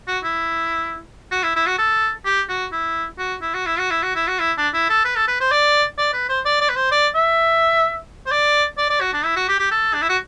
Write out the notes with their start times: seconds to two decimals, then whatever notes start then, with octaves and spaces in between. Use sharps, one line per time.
0.08 F#4
0.24 E4
1.32 F#4
1.43 E4
1.56 E4
1.67 F#4
1.79 A4
2.25 G4
2.49 F#4
2.72 E4
3.18 F#4
3.42 E4
3.54 F#4
3.66 E4
3.79 F#4
3.91 E4
4.03 F#4
4.15 E4
4.28 F#4
4.39 E4
4.58 D4
4.74 E4
4.90 A4
5.05 B4
5.16 A4
5.28 B4
5.41 C5
5.52 D5
5.98 D5
6.14 B4
6.29 C5
6.45 D5
6.61 D5
6.69 B4
6.76 C5
6.92 D5
7.15 E5
8.26 C5
8.32 D5
8.78 D5
8.90 D5
9.01 F#4
9.14 D4
9.25 E4
9.36 F#4
9.48 G4
9.59 G4
9.71 A4
9.94 D4
10.02 E4
10.09 F#4